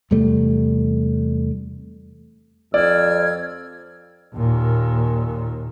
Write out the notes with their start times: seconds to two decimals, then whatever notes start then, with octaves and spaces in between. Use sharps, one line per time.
0.11 E2 C3 G3 A3
2.74 F2 D5 E6 F6 G#6
4.35 D#2 A#2